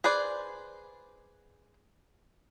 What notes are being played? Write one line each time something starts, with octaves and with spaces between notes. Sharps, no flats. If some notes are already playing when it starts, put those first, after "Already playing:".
G#4 B4 C5 D5